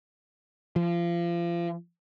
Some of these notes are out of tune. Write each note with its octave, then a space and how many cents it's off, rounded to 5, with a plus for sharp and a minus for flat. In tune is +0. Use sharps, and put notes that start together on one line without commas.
F3 -30